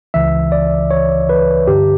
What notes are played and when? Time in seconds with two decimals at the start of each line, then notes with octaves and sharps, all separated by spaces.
0.14 C#2 C#3 E3 E5
0.52 D5
0.91 C#5
1.29 B4
1.67 G2 D3 G4